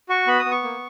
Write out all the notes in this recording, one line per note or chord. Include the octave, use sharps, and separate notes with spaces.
F#4 C#6
B3 B5
D#6
B3
C#6
A#3